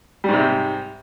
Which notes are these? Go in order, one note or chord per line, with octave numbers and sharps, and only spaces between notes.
G#2 C3 G3